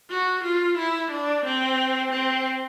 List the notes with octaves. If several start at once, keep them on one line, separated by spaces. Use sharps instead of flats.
F#4
F4
E4
D4
C4
C4